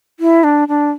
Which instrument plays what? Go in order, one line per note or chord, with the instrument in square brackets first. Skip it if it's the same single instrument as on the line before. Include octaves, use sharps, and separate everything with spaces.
[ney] E4
D4
D4